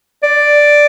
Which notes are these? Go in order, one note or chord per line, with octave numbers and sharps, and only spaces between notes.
D5